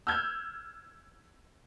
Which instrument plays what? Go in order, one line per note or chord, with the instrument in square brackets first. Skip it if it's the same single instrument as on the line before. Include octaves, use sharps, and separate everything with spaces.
[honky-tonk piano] E6 F6 G6 G#6